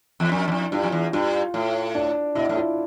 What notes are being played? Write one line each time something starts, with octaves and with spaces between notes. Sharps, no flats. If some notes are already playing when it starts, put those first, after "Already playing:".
E2
F2 D4
E2
F2 E4
G2 F4
F2
E2
G2 F4
A2
D4
B2 E4
A2
F4